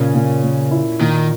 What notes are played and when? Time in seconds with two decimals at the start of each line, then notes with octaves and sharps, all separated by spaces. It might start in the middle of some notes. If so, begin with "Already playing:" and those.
Already playing: A#2 C#3 C#4
0.15 A#2
0.43 A#3
0.71 E4
1.00 A#2 D#3